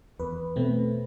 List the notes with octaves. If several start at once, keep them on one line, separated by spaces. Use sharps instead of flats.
E2 B4
B2 A3 C4